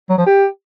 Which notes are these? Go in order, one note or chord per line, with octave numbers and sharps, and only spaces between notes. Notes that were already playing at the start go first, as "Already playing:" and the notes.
F#3
F3
G4